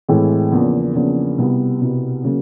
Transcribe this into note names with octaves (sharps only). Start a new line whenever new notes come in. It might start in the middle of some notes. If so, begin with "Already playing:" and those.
A2 E3 G#3 C4
E2 C#3 F3 A#3 D4
E2 C#3 F3 A#3 D4
C2 B2 G3 B3
C2 B2 G3 B3
C#3 F#3 A#3